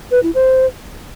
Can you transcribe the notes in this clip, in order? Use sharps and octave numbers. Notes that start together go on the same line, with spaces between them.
B4
E4
C5